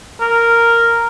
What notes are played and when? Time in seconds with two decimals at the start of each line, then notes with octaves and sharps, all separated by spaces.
0.21 A#4